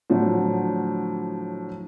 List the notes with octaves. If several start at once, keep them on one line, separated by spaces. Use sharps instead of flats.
A2 D3 F3 F#3